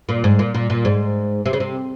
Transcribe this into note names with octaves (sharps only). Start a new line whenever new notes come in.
A#2
G#2
A#2
A#2
A#2
G#2
C3
C#3
C3